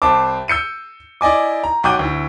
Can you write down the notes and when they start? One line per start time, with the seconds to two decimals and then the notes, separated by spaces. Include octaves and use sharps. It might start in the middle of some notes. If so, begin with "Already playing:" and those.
0.02 C2 C5 A5 D6
0.48 E6 G6 C#7 D#7
1.21 E4 D5 D#5 G#5 D6
1.64 A#5
1.84 B1 F#4 G5 D6 G6 D#7
1.99 D2 E4